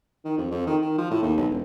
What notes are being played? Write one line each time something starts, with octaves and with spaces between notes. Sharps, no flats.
D#3
F2
F2
D#3
D#3
F3
A2
D#2
B1
E1